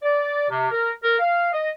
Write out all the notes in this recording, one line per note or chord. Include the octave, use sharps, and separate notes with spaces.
D5
C3
A#4
A#4
F5
D#5